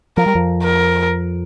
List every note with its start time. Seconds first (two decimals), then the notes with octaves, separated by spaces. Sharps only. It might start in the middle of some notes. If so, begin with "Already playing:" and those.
0.17 F3 A#4
0.26 G3
0.35 F2 F3
0.64 A#4